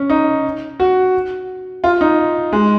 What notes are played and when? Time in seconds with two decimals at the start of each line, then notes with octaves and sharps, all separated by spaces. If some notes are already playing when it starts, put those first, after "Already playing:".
Already playing: C#4
0.10 D#4
0.80 F#4
1.84 F4
2.01 D#4
2.53 G#3